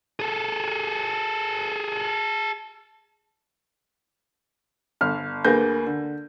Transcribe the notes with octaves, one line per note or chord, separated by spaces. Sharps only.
G#4 A4
G1 F6
D2 A#3 G#4 B4 G6 A#6
D3